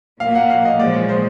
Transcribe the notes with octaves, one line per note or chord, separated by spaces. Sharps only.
A#2 F#3 A#3 F5
F#5
F5
D#5
A#2 F3 G#3 D5
C#5
C5